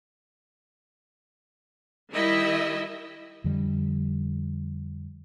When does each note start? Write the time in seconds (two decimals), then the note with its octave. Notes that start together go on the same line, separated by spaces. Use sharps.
2.12 D#3 G3 E4 D#5 E5
3.44 F2 D3 G3